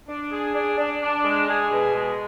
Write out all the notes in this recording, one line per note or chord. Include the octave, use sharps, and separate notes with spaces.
D4
G#4
D4
D4
D4
G#3
G#4
B2
G#3